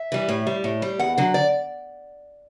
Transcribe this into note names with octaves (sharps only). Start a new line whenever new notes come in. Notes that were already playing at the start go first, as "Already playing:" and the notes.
Already playing: E5
E3 G3
A2
G3
A2
G3
E2 F#5
D3 F#3
D5